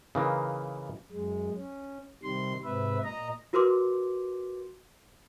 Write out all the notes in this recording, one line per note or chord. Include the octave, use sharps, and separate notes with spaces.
C#3 E3 A#3 D#4
F#2 G#3
C#4
C3 D#3 G3 C6
G#2 C3 B4 E5
A#2 D#5 A#5
F4 F#4 A#4 B4 C6 D6